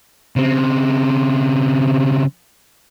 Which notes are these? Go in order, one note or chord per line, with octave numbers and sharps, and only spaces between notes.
C#3 C4